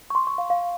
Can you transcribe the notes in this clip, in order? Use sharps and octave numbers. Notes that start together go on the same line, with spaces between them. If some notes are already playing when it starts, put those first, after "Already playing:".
C#6
C6
C#6
F5
F5